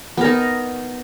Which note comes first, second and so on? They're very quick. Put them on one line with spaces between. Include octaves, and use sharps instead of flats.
B3 A#4 D#4